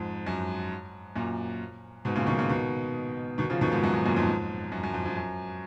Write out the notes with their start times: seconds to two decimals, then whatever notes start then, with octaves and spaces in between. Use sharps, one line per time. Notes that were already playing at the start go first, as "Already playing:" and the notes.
Already playing: F2 G#2
0.26 F#2
1.16 F#2 A#2
2.05 G#2 B2
2.16 A#2 C#3
2.27 B2 D#3
2.38 A#2 C#3
2.49 B2 D#3
3.38 B2 D#3
3.50 C#3 F3
3.61 B2 D#3
3.72 F2 G#2
3.84 F#2
3.94 F#2
4.05 F#2 A#2
4.16 F2 G#2
4.72 F#2
4.83 F#2
4.94 F2
5.06 F2
5.17 F#2